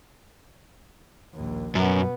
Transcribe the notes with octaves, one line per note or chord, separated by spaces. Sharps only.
A#1 D#2
F#2 B2 B3